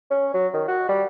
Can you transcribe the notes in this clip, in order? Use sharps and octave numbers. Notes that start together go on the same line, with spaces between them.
C#4
F#3
D#3
F#4
G3